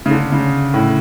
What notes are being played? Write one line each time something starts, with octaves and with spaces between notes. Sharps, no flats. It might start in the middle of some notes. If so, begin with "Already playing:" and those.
C#3
D3
C#3
A2